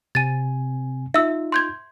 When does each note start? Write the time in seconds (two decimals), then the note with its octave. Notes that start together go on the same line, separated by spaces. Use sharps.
0.15 C3 C4 G#5 A6 D#7
1.14 D#4 F4 E5 E6
1.52 C6 G6 G#6